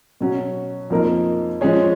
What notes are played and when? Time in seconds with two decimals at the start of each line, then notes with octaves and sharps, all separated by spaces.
0.21 B2 F#3 C#4
0.90 F2 F3 A#3 D#4 A#4
1.61 F3 G#3 C#4 G#4 C#5